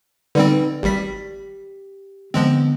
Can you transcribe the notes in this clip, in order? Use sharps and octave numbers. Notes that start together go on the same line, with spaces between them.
D3 G3 C4 D#4 B4 D5
G#1 G3 G4 B6
D3 F3 G#3 B3 C4